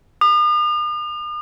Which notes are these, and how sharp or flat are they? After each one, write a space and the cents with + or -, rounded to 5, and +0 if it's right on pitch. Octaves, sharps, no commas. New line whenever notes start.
D#6 -45